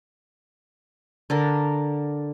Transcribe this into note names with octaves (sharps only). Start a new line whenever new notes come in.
D3 D4 A#4